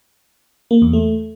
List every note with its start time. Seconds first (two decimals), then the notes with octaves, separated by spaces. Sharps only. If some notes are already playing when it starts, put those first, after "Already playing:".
0.71 A#3
0.82 E2
0.93 A3